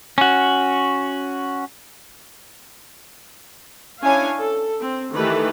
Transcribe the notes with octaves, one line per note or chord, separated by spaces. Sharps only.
C#4 F#4
C#4 D4 E4 C#5 F5 G#5
A4
C4
D#3 E3 A3 G4 A4 B4